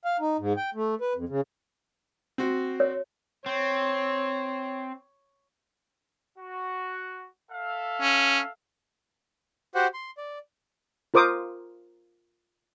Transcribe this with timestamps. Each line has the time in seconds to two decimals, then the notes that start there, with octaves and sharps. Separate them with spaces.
0.05 F5
0.20 D#4
0.39 G#2
0.57 G5
0.74 A3
1.01 B4
1.15 F2
1.29 C#3
2.38 C4 F#4
2.80 C#5
3.46 C4 C#5
6.38 F#4
7.51 A4 E5 F5
8.01 C#4
9.75 F#4 G4 C5 F#5
9.94 C6
10.17 D5
11.14 F4 A#4 C5 D6 D#6